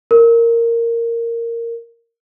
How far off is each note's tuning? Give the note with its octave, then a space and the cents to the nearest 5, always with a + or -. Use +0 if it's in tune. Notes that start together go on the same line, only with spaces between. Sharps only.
A#4 -10